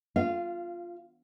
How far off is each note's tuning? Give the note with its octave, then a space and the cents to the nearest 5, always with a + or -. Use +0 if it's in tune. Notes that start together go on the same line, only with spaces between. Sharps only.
F4 +0 F5 -25